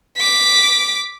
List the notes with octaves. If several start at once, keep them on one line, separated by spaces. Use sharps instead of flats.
D6 B6